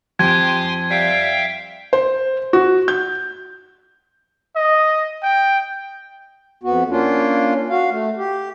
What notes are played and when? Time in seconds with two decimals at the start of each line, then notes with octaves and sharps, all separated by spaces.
0.19 F2 G4 G#5 C6 G#6
0.90 G3 E5 F5 G5
1.93 C5
2.53 F#4
2.88 G6
4.56 D#5
5.23 G5
6.63 F2 B3 F#4
6.90 A#3 C#4 D4 F4
7.70 F#4 F5
7.91 A3
8.18 G4